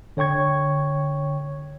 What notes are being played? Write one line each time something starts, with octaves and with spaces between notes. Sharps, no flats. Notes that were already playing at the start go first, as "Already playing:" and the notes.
D3 C#5 G5 C#6 G#6